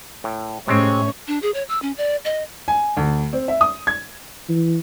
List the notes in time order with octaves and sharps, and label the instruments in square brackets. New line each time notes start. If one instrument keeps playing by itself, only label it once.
[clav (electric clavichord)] A2
[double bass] A2 [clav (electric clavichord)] C3 G#3 C4 [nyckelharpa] C#4 C#5
[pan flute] D4
G#4
C#5
E6
C#4
D5
D#5
[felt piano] G#5
D2
C4
E5
D#6
G#6
[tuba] E3